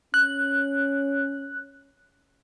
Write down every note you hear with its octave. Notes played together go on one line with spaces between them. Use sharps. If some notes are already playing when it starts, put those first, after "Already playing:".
C#4 F#6